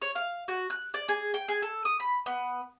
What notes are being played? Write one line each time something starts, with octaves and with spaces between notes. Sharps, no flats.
C#5
F5
F#4
F#6
D5
G#4
G5
G#4
A4
D#6
B5
B3